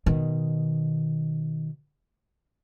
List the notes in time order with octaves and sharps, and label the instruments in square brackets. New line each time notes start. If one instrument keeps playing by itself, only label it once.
[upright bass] B2 D#3